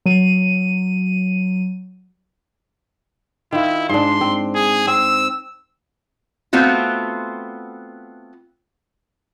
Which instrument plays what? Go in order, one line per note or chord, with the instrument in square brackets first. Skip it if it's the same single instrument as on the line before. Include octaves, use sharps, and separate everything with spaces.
[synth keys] F#3 D#7
[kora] D#3 F4 [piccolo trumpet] E4
[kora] G#2 D4 [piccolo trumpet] C6
[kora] C4
[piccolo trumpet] G#4
[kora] C4 [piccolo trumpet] E6
[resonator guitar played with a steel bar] A3 B3 C4 F4 F#4